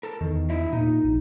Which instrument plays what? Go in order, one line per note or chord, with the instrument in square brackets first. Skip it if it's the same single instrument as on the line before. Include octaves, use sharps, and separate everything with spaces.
[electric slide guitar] A4 A#4
[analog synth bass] E2 [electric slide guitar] D#3
[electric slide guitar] E4 D#5 E5
[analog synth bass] A#2 [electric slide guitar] D#4
[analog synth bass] A#1